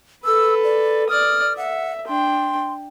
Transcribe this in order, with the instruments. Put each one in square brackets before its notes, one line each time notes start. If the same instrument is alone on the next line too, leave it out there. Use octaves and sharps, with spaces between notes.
[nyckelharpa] A4 B4 [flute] E6
[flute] D5
[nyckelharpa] D5 D#6 [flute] F6
[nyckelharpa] E5 [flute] F#5
[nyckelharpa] D4 G5 [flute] C6